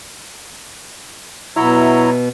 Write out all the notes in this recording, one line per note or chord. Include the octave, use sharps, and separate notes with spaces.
B2 F#3 E4 C#5 A#5